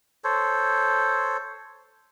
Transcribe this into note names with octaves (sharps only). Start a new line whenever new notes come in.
A4 C5 C#5